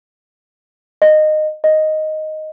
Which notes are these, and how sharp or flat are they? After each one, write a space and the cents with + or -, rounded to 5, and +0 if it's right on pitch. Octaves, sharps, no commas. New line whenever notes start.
D#5 -15
D#5 +0